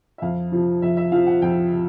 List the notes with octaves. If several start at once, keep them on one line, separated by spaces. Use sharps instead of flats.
E5
F2 F5
C3 F3
F2 E5
E5
C3 F3 F5
F#5
F2 G5
C3